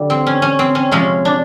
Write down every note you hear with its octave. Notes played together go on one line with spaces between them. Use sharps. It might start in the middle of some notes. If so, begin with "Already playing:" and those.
Already playing: D3 G3
C4
C#4
C#4
C4
C#4
C3 F3 G#3 C#4
D4